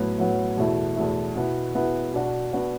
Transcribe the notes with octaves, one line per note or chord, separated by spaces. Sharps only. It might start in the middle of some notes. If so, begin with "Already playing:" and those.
Already playing: A2 F#3 B3
A2 F#3 B3
E2 B2 A3 E4
E2 B2 A3 E4
B2 B3 E4
B2 B3 E4
B2 B3 D4 F#4
B2 B3 D4 F#4